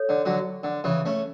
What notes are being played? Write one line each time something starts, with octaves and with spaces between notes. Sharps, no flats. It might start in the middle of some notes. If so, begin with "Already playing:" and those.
Already playing: A4 C#5
D3
D3 F#3
D3
C#3 E3
A3 C#4